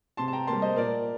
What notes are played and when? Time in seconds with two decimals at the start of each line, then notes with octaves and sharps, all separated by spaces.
0.17 C3 A5 C6
0.28 A5
0.33 G5 A#5
0.47 G3 A#3 A5 C6
0.62 C5 D#5
0.77 A#2 A#4 D5